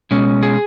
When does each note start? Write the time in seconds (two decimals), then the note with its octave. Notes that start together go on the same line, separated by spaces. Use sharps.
0.11 B2 G#3 C#4
0.43 G#4